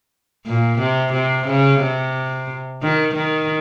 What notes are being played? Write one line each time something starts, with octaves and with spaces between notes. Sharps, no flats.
A#2
C3
C3
C#3
C3
D#3
D#3